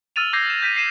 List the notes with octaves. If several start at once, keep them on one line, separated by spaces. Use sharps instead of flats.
E6 F6 A6 D#7 F7
D6 E6 G6 G#6 A#6 C7
E7
G6 B6 D#7
C7 D#7 E7